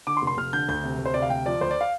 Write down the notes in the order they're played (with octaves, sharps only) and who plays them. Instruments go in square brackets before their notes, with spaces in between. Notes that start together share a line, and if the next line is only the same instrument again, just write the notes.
[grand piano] D3 D6
C6
F1
C6
F1 F6
D3 G6
D2 G6
C3
D2
C5
C3 D5
F5
D2 G5
F3 D5
D2 C5
D5
F5